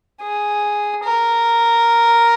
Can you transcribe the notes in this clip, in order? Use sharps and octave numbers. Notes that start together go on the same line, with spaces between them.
G#4
A#4